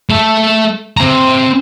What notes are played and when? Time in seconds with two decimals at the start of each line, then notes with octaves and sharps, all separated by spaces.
0.10 A3 A4
0.97 C4 A#5